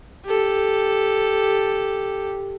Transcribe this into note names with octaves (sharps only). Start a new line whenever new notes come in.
G4 A4